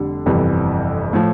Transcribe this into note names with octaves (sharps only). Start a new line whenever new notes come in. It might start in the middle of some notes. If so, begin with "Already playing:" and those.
Already playing: F1 D3 G3 D4
G1 F2 C3 E3
A2 F3